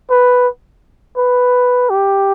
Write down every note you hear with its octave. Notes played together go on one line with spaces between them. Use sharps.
B4
B4
G4